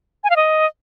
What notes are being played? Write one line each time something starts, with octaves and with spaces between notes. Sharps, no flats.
G#5
F5
D#5